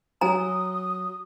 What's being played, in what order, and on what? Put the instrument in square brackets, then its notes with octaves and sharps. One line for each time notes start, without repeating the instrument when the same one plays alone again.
[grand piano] F#3 [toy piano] G#5 A#5 [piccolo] D#6